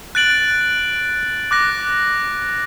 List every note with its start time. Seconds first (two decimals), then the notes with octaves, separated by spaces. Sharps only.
0.15 F#6 A6 D7 F#7
1.51 D6 F#6 A#6